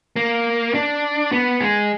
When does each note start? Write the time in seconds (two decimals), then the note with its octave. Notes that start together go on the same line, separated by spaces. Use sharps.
0.16 A#3
0.74 D4
1.32 B3
1.60 G#3